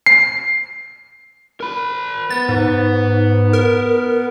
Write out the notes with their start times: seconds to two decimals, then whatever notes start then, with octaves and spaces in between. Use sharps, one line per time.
0.06 C7
1.60 A#4 B5
2.30 B3 A6
2.49 G#2
3.53 A#4